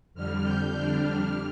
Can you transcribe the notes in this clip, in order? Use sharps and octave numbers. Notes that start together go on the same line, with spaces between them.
F2 D3 G3 F6
G6
F2 D3 G3 D4 F6
F6